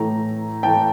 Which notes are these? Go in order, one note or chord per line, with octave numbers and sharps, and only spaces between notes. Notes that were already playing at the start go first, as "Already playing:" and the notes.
Already playing: A2 E3 A3 A#5
A2 E3 A3 G5 A5